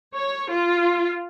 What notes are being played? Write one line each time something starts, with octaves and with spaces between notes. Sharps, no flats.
C#5
F4